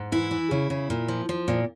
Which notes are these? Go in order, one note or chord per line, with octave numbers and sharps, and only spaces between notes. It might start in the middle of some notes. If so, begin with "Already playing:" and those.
Already playing: G#2
E3 E4
E3
C#3
C#3
A#2
F3
F3
A#2